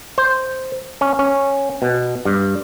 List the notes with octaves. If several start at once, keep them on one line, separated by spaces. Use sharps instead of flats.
C5
C#4
C#4
B2
G2